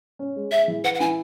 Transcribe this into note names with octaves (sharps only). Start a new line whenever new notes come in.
C#4
G#3
G#4 E5
E3
B4 F#5
F#5
E4 G#5